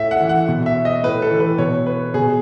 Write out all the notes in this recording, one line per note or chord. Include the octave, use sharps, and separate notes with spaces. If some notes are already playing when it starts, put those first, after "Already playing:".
Already playing: A2 E5
F#5
E3
F#5
B2
E5
D#5
A2 B4
A4
E3
B4
B2 C#5
B4
B2 G#4